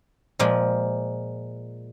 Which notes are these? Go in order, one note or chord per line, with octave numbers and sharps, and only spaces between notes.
A#2 F3 G#3